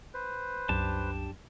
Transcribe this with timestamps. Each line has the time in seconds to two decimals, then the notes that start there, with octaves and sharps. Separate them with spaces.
0.14 B4 C5
0.69 C2 F#2 D4 G4 A5